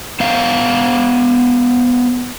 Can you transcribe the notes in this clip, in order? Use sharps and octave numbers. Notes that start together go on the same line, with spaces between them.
B3 C5 F5 G5 A#5